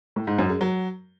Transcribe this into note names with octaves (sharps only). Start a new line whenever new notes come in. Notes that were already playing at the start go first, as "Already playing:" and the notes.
A2
G#2
F#2
G#3
F#3